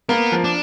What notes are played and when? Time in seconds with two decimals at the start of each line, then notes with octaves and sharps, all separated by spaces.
0.09 A#3 B3
0.32 F3
0.44 D4